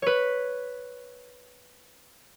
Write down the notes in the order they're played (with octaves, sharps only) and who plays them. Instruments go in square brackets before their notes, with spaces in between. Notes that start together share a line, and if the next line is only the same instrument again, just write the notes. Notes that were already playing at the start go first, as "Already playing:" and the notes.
[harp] B4 C#5